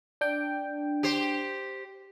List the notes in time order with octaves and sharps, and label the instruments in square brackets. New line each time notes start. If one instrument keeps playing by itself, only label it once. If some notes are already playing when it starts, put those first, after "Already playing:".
[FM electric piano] D4 G5
[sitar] G4 C5